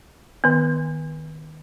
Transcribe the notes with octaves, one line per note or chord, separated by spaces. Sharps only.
D#3 B3